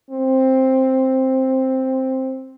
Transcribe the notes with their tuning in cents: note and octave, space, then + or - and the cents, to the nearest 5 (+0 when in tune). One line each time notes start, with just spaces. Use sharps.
C4 +5